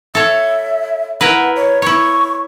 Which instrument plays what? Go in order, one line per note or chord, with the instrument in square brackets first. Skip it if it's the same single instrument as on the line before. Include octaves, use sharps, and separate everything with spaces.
[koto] A4 C#5 [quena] E5
[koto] E4 A#4 B4 [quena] F#5
[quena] C#5
[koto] E4 C#5 [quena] C#6